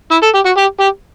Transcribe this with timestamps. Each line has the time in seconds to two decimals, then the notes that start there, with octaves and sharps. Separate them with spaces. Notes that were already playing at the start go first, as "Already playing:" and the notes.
0.11 E4
0.23 A4
0.34 G4
0.45 F#4
0.57 G4
0.80 G4